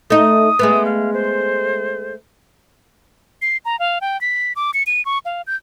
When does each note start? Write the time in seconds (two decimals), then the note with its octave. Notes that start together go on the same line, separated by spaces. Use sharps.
0.10 A3 D#4 D#6
0.59 G#3 A3 B3
0.85 F5
1.13 C5
3.42 C7
3.65 A#5
3.79 F5
4.01 G5
4.21 B6
4.56 D6
4.74 C#7
4.87 D#7
5.05 C#6
5.25 F5
5.47 G6